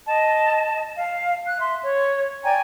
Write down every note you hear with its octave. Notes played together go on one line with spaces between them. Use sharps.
D#5 A5
F5
F#6
E5 C6
C#5
D5 G5 G#5 A#5